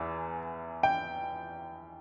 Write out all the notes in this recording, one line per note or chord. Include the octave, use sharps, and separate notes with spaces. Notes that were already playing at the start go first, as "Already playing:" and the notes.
Already playing: E2 E3
G5